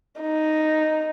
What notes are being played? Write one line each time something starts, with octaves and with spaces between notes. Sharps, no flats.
D#4